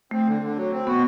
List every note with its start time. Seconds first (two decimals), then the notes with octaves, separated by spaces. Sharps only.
0.11 A3 C4
0.27 D3
0.42 D3
0.56 F#3
0.72 C4
0.86 B3 F#4